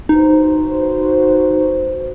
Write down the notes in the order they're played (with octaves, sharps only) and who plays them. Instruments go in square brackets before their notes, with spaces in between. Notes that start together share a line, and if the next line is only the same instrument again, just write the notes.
[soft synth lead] D#4 [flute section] F#4 B4 C5